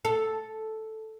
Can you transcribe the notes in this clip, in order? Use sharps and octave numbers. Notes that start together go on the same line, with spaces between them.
A4